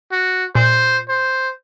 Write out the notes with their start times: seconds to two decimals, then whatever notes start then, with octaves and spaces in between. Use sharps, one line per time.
0.12 F#4
0.55 A#2 C5
1.09 C5